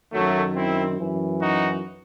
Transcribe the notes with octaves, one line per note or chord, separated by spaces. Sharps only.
F#2 D#3 F#3 A3
C4 E4
F#2 E3
D#4 F#4